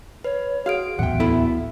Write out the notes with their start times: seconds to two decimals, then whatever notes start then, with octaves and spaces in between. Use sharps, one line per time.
0.24 B4 C#5
0.66 F#4 G#4 F5 F6 D7
0.99 D1 A1 E2 E5 F#5 G5
1.20 B3 E4 A4